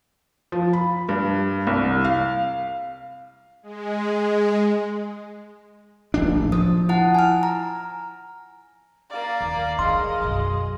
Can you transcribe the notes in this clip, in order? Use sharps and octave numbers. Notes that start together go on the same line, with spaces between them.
F3
B5
G2
C2
F5
G#3
D1 A#1 D4
F3 D#6
E4 F#5 A5
G#5 F6
A#5
A#3 D5 F5 A#5 F6
D#2
D#3 G#3 D#5 C6
B1 F#2